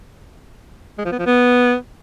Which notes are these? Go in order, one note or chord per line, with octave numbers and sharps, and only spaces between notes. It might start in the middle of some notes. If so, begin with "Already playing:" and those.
G#3
F3
B3
F3
B3